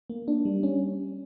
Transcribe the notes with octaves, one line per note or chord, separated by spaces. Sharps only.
A#3
D4
G3
C#4